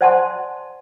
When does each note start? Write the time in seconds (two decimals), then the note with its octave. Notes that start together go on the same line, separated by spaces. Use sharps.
0.01 C5 D5 F#5 G#5 A5 C6